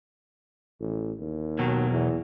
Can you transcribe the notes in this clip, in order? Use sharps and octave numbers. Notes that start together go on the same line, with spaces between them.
A1
D#2
B2 D#3 F#3
E2